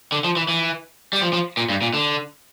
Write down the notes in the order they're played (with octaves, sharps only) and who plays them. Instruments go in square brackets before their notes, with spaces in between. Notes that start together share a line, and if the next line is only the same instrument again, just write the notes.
[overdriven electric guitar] D3
F3
E3
E3
G3
F3
F3
A#2
G2
A#2
D3